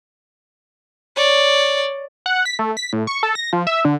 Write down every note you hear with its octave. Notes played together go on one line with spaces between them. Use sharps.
C#5 D5
F#5
B6
A3
B6
A2
C#6
A4
A#6
F3
E5
D3